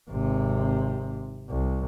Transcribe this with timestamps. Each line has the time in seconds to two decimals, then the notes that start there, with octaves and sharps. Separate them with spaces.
0.10 G#1 C3
1.50 C2